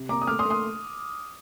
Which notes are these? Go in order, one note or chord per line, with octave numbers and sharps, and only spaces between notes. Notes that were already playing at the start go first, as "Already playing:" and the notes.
Already playing: C3
A#3 A#5 D6
D#6
A3 D6 F6
C6 D#6
A3
C6 D#6